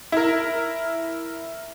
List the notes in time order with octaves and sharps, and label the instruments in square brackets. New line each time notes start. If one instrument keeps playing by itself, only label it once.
[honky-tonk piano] E4 A#4